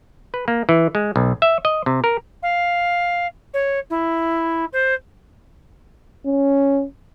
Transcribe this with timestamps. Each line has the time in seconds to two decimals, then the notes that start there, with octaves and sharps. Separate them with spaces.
0.34 B4
0.48 A#3
0.69 E3
0.95 G#3
1.16 B1
1.42 E5
1.65 D#5
1.86 C3
2.04 A#4
2.43 F5
3.54 C#5
3.90 E4
4.73 C5
6.26 C#4